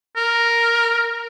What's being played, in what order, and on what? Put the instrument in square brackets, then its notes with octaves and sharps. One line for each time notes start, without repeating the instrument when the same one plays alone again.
[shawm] A#4